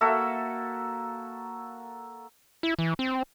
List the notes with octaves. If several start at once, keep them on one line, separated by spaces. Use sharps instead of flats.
A#3 F#4 A4 E5
E4
E3
C4